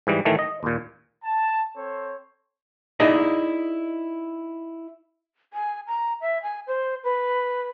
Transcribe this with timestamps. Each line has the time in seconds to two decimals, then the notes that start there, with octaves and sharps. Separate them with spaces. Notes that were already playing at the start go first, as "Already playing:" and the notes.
0.07 G#2 E3 G3
0.25 A2 D#3 E3 A3
0.39 D#5
0.63 D#2 A#2
1.23 A5
1.76 C4 A4 C5 C#5
3.00 D#4 E4 G#4 D5 D#5
5.53 G#5
5.87 A#5
6.21 E5
6.43 G#5
6.67 C5
7.04 B4